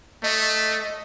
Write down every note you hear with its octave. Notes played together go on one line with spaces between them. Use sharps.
A3 D#5